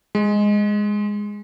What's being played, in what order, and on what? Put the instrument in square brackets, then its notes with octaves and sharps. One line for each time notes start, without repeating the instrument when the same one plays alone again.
[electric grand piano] G#3